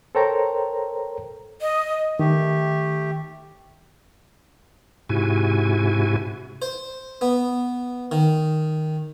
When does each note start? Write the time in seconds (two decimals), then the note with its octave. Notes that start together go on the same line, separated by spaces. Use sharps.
0.15 A4 A#4 C5 C#5 G5 A#5
1.61 D#5
2.19 D#3 A3 G4
5.09 G#2 C3 E4 F#4 G#5
6.62 C5
7.21 B3
8.12 D#3